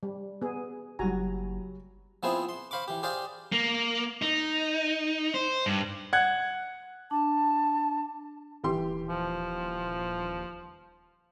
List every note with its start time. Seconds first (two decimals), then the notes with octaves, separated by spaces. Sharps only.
0.03 G3
0.42 B3 G#4
0.99 F#1 F#3 G3 F#4 G#5 A#5
2.23 F3 B3 C4 E4 G#4 C5
2.49 C6
2.71 C5 F5 B5 C#6 D6
2.88 E3 G4
3.03 G4 G#4 C5 D5 F5 G5
3.52 A#3
4.22 D#4
5.34 C5
5.66 G2
6.13 F#5 F#6 G#6
7.11 D4 A5
8.64 D#1 E3 G4 C6
9.09 F3